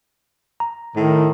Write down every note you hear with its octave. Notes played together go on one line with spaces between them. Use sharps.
A#5
A2 D#3